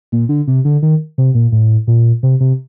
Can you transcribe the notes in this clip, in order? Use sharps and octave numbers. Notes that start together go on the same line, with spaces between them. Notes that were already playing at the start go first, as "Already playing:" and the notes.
A#2
D3
C3
D3
D#3
C3
A#2
A2
A#2
C3
C3